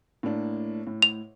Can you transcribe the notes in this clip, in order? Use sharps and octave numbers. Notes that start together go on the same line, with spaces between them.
A2 A#3 D4
A2
F7